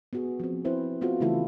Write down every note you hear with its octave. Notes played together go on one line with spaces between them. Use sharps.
B3 F#4 G#4
F3 C4
C4 E4 B4 C5
B3 C4 F4 F#4 A4 C5
C#3 E3 A3 E4 F4 A4